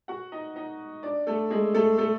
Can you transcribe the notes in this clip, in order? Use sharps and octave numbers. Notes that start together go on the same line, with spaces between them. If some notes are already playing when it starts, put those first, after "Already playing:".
F#4 F#5
D#4 D#5
D#4 D#5
D4 D5
A3 A4
G#3 G#4
A3 A4
A3 A4